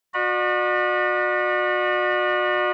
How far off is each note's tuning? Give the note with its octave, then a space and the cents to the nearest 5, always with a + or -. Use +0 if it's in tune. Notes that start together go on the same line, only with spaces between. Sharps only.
F#4 -35 D5 +45 B5 -30